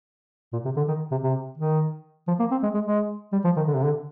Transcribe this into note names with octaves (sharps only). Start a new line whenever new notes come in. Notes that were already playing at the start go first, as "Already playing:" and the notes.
A#2
C3
D3
D#3
C3
C3
D#3
F3
A#3
C4
G#3
G#3
G#3
G3
F3
D#3
D3
C3
D3